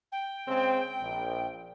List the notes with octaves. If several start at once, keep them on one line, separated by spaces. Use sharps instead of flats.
G5
C#3 G#3 C4
A#1